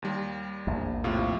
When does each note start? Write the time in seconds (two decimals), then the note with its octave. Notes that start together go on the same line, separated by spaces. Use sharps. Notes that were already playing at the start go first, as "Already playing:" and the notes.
0.02 D#2 G3
0.67 A#1 E2
1.04 A2 C3 F4